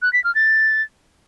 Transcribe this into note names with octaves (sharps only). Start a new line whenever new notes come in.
F#6
B6
F6
A6